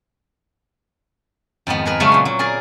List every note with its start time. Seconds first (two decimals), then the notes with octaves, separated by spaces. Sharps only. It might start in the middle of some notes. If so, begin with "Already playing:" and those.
1.67 F2 G#2 D#3 B3
1.85 G#4 A#4 B4
2.00 C#3 F#3 G#3 A3 B3 C#4
2.12 A#2 C6
2.25 F#3
2.39 G#4 A#4 D5